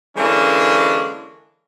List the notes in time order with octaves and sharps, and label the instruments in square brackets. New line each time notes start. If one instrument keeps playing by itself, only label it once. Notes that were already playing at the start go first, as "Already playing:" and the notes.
[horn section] D3 E3 G#3 A#3 C#4 D4